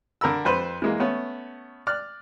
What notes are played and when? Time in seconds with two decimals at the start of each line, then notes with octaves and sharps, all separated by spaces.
0.21 D3 A#4 B5 E6
0.45 F2 B4 C5 B5
0.82 E3 G#3 A#3
1.00 A3 B3 C#4
1.87 D5 F6 F#6